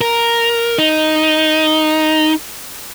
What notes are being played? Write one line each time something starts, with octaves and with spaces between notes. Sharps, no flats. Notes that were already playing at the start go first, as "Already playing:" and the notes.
A#4
D#4